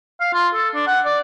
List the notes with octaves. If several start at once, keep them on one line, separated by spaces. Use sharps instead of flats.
F5
F4
A4
D4
F#5
D5